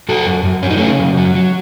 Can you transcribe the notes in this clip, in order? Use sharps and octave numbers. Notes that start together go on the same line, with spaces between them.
F#2 F#4 A4
F#2
F#2
F#3 C#4
D#4
C#3 A3 C#4
F#2
F#3
F#3